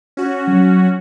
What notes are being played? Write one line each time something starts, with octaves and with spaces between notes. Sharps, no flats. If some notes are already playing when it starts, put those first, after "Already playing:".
C#4 F#4
F#3